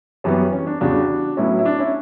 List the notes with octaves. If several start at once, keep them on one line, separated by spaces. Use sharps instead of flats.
F#2 E3 G3 B3 C#4
C#4
D4
E2 C#3 G3 D4 F#4
A2 F#3 B3 C#4 E4
E4
D4
C#4 E4